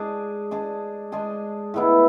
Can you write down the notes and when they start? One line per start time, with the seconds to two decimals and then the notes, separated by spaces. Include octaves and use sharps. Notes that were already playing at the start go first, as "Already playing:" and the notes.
Already playing: G#3 D4 G#4
0.51 G#3 D4 G#4
1.12 G#3 D4 G#4
1.74 A2 G#3 B3 E4